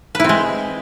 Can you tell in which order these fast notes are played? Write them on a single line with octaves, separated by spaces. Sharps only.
B4 E4 C4 G#3